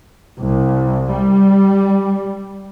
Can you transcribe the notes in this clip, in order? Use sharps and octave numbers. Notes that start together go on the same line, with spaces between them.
C2
G3